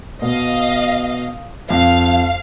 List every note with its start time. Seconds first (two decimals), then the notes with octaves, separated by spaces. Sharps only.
0.22 B2 D#5 F5
1.70 F2 F5